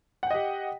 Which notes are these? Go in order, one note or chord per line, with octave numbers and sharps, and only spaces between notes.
G4 D#5 F#5 G5